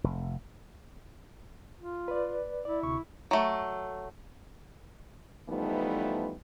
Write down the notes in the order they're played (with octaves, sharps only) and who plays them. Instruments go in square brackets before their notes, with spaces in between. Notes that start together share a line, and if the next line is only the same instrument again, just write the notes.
[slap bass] F1
[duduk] F4
[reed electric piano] B4 D5
[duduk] E4 [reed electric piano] D5
[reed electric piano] D2 C3 C#6
[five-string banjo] F#3 A3
[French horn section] E3 F3 G3 A3 B3 D#4